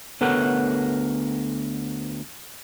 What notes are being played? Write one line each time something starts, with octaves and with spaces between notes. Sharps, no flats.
D2 B3 A4 A#4 C#5 F#5